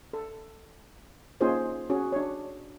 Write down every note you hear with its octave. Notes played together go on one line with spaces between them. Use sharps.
A4
A#3 C#4 D#4 F4 G#4 C5
C#4 F#4 G#4
D4 C#5